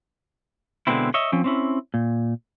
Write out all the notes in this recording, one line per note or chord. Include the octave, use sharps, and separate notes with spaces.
B2 D3 G#3 B3 C4 E4
C#5 D#5 E5
F3 C4 C#4
C4 C#4 E4
A#2